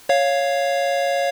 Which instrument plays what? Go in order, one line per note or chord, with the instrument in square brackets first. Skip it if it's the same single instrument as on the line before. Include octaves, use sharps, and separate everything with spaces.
[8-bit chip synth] C#5 F5